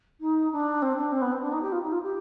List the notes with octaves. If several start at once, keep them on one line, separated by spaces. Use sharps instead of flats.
D#4
D4
C4
D4
C4
B3
C4
D4
D#4
G4
F4
D#4
F4
G4